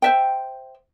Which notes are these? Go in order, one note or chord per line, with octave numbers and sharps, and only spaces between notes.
C5 E5 G5